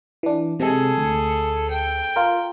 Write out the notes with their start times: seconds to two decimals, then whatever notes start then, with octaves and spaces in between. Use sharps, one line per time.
0.23 E3 D4
0.60 C3 G#3 G#4 A4
0.98 D2
1.70 G5
2.16 F4 A#4